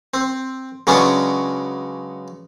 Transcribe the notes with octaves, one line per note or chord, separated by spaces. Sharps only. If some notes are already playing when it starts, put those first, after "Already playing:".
C4
C#3 F#3 G#3 B3 C#4 D4